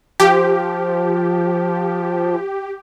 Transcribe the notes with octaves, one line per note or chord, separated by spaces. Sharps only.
F3 G4